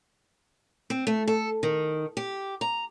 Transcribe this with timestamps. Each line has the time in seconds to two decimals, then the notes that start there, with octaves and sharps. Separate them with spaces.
0.90 C4
1.07 A3
1.28 A4
1.63 D#3
2.17 G4
2.61 A#5